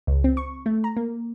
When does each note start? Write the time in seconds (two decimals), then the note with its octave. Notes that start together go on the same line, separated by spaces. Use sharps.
0.07 C#2
0.24 C4
0.37 C#6
0.66 A3
0.84 A#5
0.97 A#3